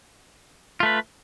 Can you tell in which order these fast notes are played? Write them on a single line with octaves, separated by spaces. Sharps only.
F4 A3 B4